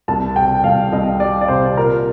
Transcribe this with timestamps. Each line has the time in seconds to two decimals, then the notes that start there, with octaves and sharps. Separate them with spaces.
0.08 C2 A5
0.36 C3 G5
0.64 C2 F5
0.92 C2 D#5
1.20 G3 D5
1.41 D5
1.48 C3 C5
1.77 A#2 A#4